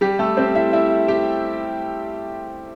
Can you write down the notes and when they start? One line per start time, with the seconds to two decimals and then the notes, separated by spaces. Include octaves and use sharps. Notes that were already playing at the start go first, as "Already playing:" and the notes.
0.01 G3 G4
0.19 A3 A4
0.37 C4 C5
0.55 E4 E5
0.73 E4 E5
1.08 G4 G5